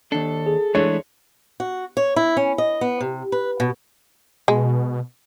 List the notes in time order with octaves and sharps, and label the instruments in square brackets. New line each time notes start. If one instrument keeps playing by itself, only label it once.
[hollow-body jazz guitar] D#2 D4 [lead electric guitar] A4
[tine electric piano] G#4
[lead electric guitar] E3 [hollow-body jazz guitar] G#3 A3 D4 [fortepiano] C#5
[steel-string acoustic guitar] F#4
C#5
E4
C#4
D#5
B3
C3
B4
B2
[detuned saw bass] B2 [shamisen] G#3